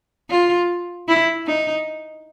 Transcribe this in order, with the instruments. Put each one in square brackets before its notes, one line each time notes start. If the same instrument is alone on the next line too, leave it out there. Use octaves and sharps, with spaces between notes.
[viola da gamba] F4
E4
D#4